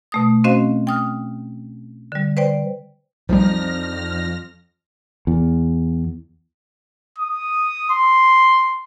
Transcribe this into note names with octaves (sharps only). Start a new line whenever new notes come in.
B2 A3 D#6
C4 C#4 F#4 C5 D#5 F5
G5 D#6 F6
D3 G3
B4 C5 D5 G5
B1 F2 F3 G3 D4 D#4 F6 A#6
E2
D#6
C6